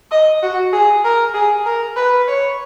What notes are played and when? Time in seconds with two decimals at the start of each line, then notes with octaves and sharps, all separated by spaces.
0.11 D#5
0.43 F#4
0.73 G#4
1.05 A#4
1.34 G#4
1.66 A#4
1.96 B4
2.28 C#5